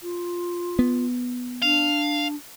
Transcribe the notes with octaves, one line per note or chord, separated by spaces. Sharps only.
F4
B3
D4 F5